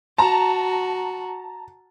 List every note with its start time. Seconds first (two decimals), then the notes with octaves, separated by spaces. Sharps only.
0.18 F#4 A5 A#5